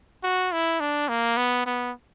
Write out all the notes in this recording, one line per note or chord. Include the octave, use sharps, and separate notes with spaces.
F#4
E4
D4
A#3
B3
B3